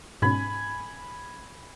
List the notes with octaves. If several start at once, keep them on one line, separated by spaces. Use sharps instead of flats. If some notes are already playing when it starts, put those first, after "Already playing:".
G#2 B2 C#4 G#5 B5